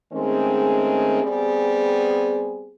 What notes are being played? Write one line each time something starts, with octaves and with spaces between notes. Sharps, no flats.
D#3 G#3 A3 C4 C#4 G#4
G3 B3 C4 G#4